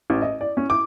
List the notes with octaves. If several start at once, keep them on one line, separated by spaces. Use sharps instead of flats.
A1
D#5
D5
C#4
D6